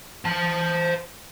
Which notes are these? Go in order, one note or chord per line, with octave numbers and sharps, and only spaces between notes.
C5 A5